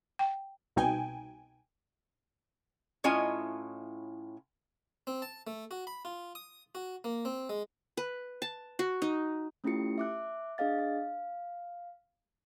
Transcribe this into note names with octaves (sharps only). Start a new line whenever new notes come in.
G5
C2 B2 D#4 G5 G#5
A2 C#4 E4 F4 D#5 G#5
C4
A5
A3
F#4
B5
F4
D#6
F#4
A#3
C4
G#3
B4
A5
F#4
D#4
A3 C#4 E4 F4 G4 C#7
E5 D6 F#6
D4 G#4 D#5 F5 A6
F5